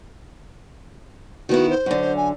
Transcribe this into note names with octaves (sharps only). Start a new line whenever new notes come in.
D#3 B3 E4 F#4
C5
F#2 D3
G#5